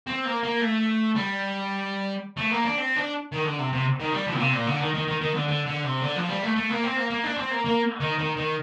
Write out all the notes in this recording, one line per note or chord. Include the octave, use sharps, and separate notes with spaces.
C4
A#3
A#3
A3
G3
A3
A#3
D4
C4
D4
D#3
D3
C3
C3
D#3
G3
F3
A#2
C3
A#2
D3
D#3
D#3
D#3
D#3
D3
D3
D3
C3
D3
F3
G3
A3
A3
A#3
C4
A#3
A#3
D4
C4
A#3
A#3
D#3
D#3
D#3